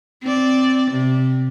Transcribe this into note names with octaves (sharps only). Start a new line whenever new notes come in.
C4 D5
C3